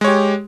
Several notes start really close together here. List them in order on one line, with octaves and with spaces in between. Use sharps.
G#3 C#5 G4